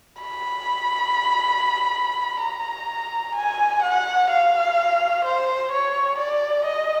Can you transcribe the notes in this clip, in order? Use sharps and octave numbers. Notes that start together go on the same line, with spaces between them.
B5
A#5
G#5
F#5
F5
C5
C#5
D5
D#5